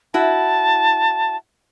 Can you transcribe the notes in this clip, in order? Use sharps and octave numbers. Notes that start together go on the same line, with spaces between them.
E4 F#4 A5